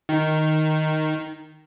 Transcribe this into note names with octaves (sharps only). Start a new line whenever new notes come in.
D#3